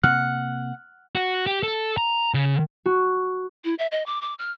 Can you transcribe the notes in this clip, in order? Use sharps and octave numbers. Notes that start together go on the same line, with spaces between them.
C3 A#3 F#5 F6 F#6
F#4
G4
A4
A#5
C#3
F#4
E4
E5
D#5
D6
D6
F6